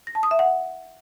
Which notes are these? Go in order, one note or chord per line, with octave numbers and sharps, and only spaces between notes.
A#6
A5
D#6
E5
F#5